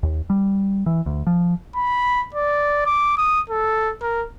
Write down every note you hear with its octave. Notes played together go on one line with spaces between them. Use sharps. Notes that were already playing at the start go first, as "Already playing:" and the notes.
D#2
G3
E3
D2
F3
B5
D5
D6
D#6
A4
A#4